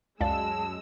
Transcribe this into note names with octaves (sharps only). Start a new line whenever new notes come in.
C#2 F#2 G#3 D5 F5 A5 E6